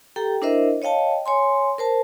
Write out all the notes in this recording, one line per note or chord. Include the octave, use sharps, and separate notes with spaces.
G4 A4 G5 A#5
D4 E4 A#4 C5 D#5 E5
C#5 D#5 F5 G5 A5
C#5 G#5 C6
A#4 C5 A5